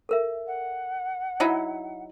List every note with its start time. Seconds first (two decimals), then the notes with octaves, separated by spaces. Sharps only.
0.09 A4 A#4 E5
0.47 F#5
1.40 F#3 D#4 E4